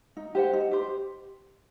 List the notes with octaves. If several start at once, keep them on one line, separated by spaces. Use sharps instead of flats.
D#4
G4 C5 F#5
D#4
G4 C5